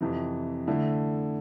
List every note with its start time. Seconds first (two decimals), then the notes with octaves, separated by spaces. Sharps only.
0.01 F2 C3 E3
0.67 D3 A3 E4